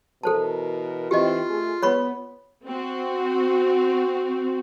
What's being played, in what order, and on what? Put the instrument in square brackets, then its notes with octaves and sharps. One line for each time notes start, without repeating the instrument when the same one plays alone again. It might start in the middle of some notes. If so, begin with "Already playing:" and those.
[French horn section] B2 E3 A#4 [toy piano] A4 C5 A5
[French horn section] E3 C4 [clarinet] F4 [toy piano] G4 D#5
[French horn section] A3 G#4
[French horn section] B3 [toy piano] C#5 B5 C#6
[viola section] C4 F#4